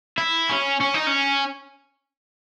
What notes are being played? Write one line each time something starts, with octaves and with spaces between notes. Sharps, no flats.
E4
C#4
C#4
D#4
C#4